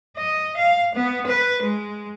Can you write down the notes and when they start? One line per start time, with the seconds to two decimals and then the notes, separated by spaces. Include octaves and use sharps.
0.17 D#5
0.57 F5
0.95 B3
1.27 B4
1.62 G#3